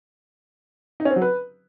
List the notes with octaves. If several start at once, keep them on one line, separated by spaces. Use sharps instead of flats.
D#4
C#4
C4
F#3
B4